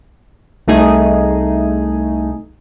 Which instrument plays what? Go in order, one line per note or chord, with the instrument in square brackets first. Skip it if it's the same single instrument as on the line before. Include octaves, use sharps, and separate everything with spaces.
[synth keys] C2 A3 D#4 G#4